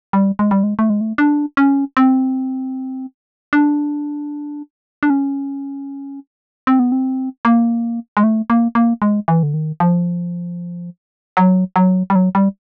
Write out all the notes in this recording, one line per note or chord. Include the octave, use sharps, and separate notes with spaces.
G3
G#3
G3
G#3
A3
G#3
A3
D4
C#4
C4
D4
D4
C#4
C4
B3
C4
A#3
G#3
A3
A#3
A#3
G#3
E3
D3
D#3
F3
F#3
F#3
G3
F#3
G3